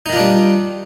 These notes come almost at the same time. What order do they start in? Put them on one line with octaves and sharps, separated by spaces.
D#4 D#3 F4 D4 G3